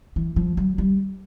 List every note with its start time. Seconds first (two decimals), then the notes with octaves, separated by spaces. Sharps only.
0.16 E3
0.36 F3
0.57 F#3
0.78 G3